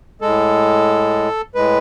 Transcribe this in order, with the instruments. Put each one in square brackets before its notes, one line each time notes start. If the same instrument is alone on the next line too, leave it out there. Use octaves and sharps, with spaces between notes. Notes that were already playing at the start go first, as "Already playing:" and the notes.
[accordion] A2 G#3 A4
A2 G#3 B4